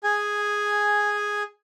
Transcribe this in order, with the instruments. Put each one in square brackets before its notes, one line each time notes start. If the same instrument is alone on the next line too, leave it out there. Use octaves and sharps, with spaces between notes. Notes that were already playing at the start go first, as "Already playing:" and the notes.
[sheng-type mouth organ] G#4 G#5